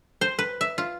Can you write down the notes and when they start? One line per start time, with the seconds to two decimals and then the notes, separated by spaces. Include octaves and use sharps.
0.21 C5
0.39 B4
0.61 E5
0.78 F4